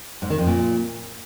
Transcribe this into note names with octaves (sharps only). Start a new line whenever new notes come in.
G#2
D#3
F2
A#2